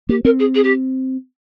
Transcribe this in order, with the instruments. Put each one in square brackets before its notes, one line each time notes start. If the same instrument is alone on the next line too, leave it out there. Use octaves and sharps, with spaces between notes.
[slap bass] A#3 [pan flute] G4
[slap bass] C4 [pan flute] A#4
[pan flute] G#4
G#4
G4